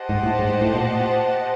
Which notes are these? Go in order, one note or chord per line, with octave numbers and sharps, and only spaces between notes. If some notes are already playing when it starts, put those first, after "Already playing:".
Already playing: G4 C5 D#5 F#5 A5
G#2
A2
G#2
A2
A#2